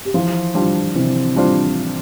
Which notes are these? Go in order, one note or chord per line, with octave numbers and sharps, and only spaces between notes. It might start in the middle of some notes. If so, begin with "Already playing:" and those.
G4
E3 F3 F4
G3 D4 F4 C5
C3 E3 C4
G3 D4 F4 C5